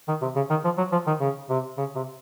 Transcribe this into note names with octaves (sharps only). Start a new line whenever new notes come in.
D#3
C3
C#3
D#3
F3
F#3
F3
D#3
C#3
C3
C#3
C3